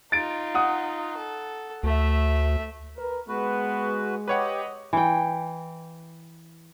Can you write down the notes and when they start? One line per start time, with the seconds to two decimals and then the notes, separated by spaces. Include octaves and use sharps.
0.12 D#4 F4 A6 D7
0.55 F#5 D#6
1.16 A4
1.83 D2 A3 E5
2.98 A#4 B4
3.29 G#3 B3 F#4 B4
4.28 G4 B4 C#5 D#5 F#5
4.93 E3 G5